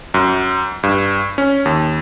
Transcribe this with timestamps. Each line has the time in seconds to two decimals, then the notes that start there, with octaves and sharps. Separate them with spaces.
0.14 F#2
0.83 G2
1.38 C#4
1.65 D#2